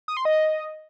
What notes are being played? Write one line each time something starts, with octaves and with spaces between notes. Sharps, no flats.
D#6
C6
D#5